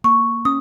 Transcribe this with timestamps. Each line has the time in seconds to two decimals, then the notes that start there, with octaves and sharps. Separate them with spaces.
0.04 A#3 C#6
0.45 C#4 D#6